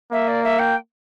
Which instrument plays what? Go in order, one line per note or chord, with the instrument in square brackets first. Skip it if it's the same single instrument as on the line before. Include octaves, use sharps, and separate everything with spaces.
[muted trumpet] A#3 [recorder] E5
[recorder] D5
E5
G5